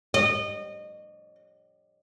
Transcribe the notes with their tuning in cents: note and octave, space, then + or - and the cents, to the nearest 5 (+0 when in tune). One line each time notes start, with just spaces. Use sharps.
D#5 -30